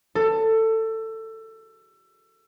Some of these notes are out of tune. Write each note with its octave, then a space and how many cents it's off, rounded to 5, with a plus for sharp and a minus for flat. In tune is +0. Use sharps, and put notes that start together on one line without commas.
A4 +20